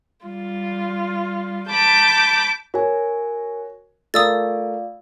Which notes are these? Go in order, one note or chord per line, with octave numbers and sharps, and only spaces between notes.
G3 F4
A5 B5 D6 G6
F#4 A#4 C#5 G#5
A3 F4 A#4 D5 F5 D#6 E6 A6